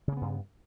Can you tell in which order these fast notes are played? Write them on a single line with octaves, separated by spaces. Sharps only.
C#3 A#3 B3 G2